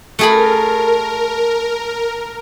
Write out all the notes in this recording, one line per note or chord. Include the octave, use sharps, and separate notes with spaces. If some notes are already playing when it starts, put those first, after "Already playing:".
A3 G#4 A#4 B5